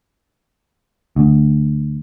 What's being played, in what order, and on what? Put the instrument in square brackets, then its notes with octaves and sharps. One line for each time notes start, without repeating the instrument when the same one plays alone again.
[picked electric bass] D2